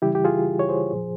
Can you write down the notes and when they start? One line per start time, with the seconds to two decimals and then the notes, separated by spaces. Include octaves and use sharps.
0.02 C#3 E3 G3 E4 G4
0.15 G4
0.25 F4 G#4
0.59 C#5
0.69 G#4 C5
0.91 A#2 F3